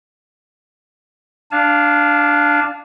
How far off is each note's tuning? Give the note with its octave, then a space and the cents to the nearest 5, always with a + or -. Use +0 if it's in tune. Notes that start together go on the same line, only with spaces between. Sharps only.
D4 +0 F5 +0 A5 -40